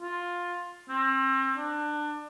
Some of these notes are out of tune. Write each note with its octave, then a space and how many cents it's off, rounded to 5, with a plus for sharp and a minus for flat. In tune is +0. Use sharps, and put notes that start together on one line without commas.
F4 +10
C4 +35
D4 +25